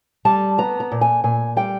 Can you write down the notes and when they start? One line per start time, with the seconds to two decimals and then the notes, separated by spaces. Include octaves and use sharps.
0.25 G3 A5
0.58 B3 A#5
0.80 A#5
0.92 A#2
1.01 G#5
1.24 A#2 G#5
1.57 G3 G5